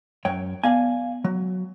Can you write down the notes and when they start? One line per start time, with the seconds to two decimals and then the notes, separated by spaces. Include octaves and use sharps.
0.25 F#2 C#5 G5
0.64 B3 D5 F5 G#5
1.24 F#3